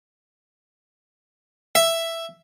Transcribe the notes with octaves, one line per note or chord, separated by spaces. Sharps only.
E5